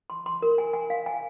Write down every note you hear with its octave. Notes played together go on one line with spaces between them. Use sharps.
C6
C6
A#4
G#5
G#5
F5
G#5